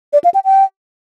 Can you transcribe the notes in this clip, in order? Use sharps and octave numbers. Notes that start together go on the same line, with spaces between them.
D5
F5
G5
G5